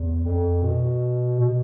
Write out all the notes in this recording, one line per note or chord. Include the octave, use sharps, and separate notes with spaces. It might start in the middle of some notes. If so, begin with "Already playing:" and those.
Already playing: E2
F2
B2
B2